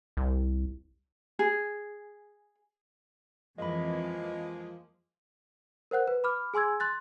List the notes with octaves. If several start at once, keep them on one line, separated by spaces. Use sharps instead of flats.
C2
G#4
F2 E3 F3 G#3 A#3 D#5 B5
A#4 C5 F#5 F#6
B4
B5 D6 F6
G#4 G#5 C6 E6 G#6
C6 F#6 A6